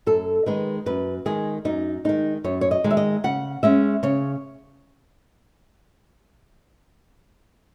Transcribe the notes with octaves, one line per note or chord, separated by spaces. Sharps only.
F#2 A4
D#3 G#3 B4
F#2 B4
D#3 G#3 G#4
F#2 D#4
D#3 G#3 D#4
F#2 C#5
C#5
D#5
D#3 G#3
E5
D#5
C#3 F#5
G#3 C#4 E5
C#3 C#5